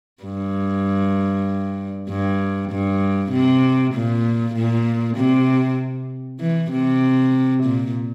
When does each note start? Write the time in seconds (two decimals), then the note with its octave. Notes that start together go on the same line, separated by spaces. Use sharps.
0.23 G2
2.09 G2
2.71 G2
3.31 C3
3.94 A#2
4.55 A#2
5.17 C3
6.40 E3
6.71 C3
7.63 A#2